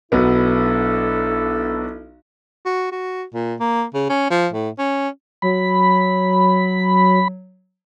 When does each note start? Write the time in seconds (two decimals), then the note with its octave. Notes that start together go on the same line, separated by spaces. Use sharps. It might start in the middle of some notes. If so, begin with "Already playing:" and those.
0.12 B1 F#3 B3 D4 E4 A4
2.65 F#4
2.92 F#4
3.34 A#2
3.60 A#3
3.94 C#3
4.09 C#4
4.30 F3
4.53 A2
4.79 C#4
5.42 F#3 B5